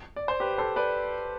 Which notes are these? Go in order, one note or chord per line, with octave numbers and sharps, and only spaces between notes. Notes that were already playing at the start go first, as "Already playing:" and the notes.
D5
C5
G4 B4
A4 C5
B4 D5